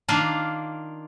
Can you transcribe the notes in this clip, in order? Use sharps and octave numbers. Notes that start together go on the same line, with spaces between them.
D#3 A#3 D4 F4